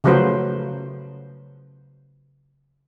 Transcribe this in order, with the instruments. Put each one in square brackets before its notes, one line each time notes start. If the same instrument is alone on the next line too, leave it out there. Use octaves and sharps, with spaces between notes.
[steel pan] C#3 F3 F#3 A3 B4 C5